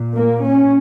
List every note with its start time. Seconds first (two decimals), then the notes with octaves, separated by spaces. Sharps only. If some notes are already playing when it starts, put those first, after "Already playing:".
Already playing: A#2
0.17 A#3
0.45 C#4